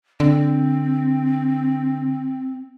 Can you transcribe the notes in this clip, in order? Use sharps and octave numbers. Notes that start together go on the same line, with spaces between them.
D3 C4